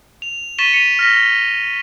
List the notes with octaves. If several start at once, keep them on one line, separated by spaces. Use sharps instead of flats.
F7
C#6 A6 B6 D#7 E7 G7
C#7 D#7 F7
F6 A#6 B6